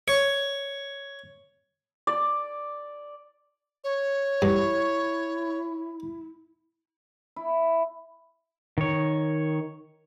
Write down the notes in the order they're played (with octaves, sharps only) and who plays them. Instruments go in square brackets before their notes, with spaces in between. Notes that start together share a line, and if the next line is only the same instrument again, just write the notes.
[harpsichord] C#5
[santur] D5
[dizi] C#5
[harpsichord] G2 [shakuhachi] E4
[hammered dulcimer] E4
[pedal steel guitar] D#3 C#5